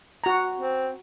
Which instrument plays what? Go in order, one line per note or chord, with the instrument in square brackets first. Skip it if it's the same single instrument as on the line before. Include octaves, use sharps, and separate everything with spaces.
[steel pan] F#4 A#5
[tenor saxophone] C4